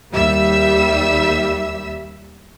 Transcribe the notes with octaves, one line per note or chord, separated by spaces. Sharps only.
D#2 G3 E5 E6